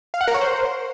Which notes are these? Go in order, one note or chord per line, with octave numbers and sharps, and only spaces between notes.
F5
F#5
A#4
C#5
C5